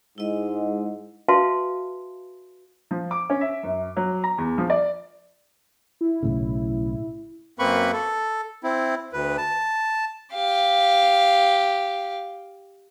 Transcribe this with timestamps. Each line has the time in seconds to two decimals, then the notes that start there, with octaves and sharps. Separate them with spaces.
0.18 G#2 G#3 E4 D#5
1.28 F#4 B4 E5 F5 A5 C6
2.91 F3
3.11 D6
3.30 C#4
3.41 E5
3.63 F#2
3.97 F#3
4.24 A#5
4.38 E2
4.58 F3
4.70 D5
6.01 E4
6.23 B1 A2 C#3
7.59 F#2 A#3 C4 B4 B5 C#6
7.93 A4
8.64 C4 E4
9.13 D2 B4
9.38 A5
10.34 G4 F5